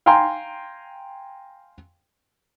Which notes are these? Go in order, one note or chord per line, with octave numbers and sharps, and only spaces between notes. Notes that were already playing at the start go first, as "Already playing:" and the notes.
F5 G5 G#5 A#5 C6